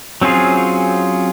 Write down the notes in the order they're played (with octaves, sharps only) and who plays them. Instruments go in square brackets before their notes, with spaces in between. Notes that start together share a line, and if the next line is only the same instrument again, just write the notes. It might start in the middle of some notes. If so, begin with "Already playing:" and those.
[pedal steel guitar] F#3 C4 C#4 F4 G#4